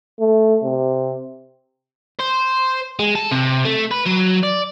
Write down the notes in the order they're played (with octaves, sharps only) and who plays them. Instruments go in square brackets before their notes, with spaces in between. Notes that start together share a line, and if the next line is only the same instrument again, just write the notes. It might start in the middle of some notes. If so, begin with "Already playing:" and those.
[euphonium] A3
C3
[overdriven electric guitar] C5
G#3
A4
C3
A3
B4
F#3
D5